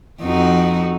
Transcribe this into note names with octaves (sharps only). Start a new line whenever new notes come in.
F2 D#4 F#4